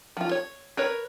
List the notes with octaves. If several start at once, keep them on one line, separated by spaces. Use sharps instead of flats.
F3 F4
C#5
A#4 B4 C#5